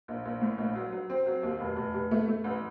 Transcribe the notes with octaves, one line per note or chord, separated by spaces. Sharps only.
A#1
A#1
A2
A#1
F#3
F#3
C4
F#3
D#2
F1
F1
F1
A3
A3
A1